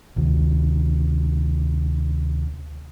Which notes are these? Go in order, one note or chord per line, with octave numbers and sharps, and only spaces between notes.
D2 C3 D#3